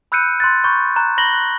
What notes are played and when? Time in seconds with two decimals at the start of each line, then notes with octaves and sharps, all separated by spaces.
0.12 B5 E6 F#6 G6 C#7 D#7
0.40 C6 F#6 A6
0.64 B5 C#6 G6
0.96 A#5 F#6
1.18 B5 A#6 F#7 G7
1.33 F#6